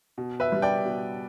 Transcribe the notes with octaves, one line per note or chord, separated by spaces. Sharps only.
B2
B4 E5
G3
D5 G5
B2